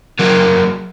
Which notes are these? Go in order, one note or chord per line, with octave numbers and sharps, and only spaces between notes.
F#3 A#3